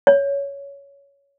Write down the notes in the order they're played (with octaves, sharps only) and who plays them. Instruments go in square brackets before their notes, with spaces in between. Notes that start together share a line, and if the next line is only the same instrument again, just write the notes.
[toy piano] C#5